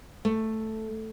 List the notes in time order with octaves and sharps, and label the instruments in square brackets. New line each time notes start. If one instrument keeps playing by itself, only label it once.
[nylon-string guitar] A3